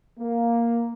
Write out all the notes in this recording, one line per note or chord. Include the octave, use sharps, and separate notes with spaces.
A#3